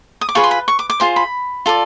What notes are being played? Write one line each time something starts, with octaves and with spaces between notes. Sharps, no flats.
D#6
D6
F4 G#4 B4 C#6
C6
B5
C#6
D6
D6
F4 G#4 C5 C6
B5
F4 A4 D5